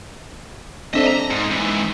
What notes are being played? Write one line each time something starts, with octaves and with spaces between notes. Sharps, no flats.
C4 D4 A4 D#5 E5
A#5
G#2
G#2 E3